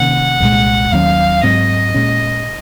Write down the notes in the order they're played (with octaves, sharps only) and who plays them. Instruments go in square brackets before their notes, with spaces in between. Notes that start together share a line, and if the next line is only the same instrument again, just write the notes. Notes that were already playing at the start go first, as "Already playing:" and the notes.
Already playing: [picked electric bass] C3 D#3 A#3 C#4 [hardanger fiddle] F#5
[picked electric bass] C2 A#2 G#3
[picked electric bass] D#2 D#3 F#3 C#4 [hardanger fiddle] F5
[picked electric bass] G#2 F#3 C4 [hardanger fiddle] D#5
[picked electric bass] A#2 G#3 C#4